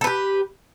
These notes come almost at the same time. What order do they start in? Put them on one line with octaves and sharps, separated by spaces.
A4 B4 G4